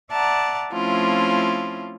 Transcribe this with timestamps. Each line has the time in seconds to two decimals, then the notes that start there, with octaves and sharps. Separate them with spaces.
0.12 D5 E5 F#5 A5 A#5
0.72 F3 A3 C4 C#4 E4 F4